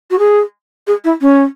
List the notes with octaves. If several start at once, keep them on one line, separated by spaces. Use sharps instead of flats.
F#4
G#4
G#4
E4
C#4